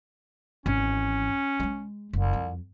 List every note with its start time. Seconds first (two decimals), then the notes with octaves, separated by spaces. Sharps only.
0.66 G#1 E3 C#4
1.60 G#3 A3
2.13 F#1 C2
2.33 F2